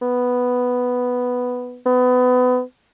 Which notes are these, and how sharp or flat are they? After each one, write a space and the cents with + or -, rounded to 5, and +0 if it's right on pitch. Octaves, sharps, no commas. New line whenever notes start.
B3 +0
B3 +25